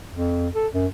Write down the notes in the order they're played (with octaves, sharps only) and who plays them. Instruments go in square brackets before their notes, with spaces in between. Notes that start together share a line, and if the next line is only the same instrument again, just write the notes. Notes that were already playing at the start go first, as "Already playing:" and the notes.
[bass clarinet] F2
A4
F#2